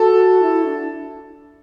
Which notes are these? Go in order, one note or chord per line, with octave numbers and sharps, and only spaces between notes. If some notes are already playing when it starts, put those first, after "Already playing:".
Already playing: F#4 A4
E4
D4